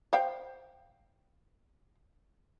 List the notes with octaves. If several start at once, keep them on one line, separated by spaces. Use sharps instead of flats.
C5 F5 G5